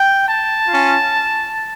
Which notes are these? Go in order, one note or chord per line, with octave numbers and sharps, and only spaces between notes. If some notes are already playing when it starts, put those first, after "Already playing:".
Already playing: G5
A5
C#4 F4